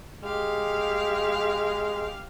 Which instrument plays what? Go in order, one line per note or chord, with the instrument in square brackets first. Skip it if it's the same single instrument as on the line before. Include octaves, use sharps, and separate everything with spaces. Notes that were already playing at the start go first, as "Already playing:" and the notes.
[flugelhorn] G#3 [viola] G4 F5